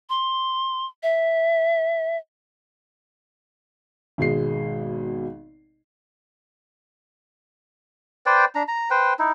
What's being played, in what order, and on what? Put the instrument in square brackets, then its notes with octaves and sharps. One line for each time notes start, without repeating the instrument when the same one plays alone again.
[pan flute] C6
E5
[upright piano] G#1 B2 G#3 C7
[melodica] B4 C5 D5 G5
D4 A#5
A#5
B4 C5 G5
D#4 E4